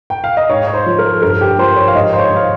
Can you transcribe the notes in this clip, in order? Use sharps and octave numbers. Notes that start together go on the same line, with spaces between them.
G5
F5
D#5
G#2 C#5
C#5
C5
F3
A#4
G2 A#4
G4
F3 C5
C#5
F5
G#2 D#5
C5
C#5
D#3
F5